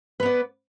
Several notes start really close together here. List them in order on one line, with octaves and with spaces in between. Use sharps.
B4 B3 D5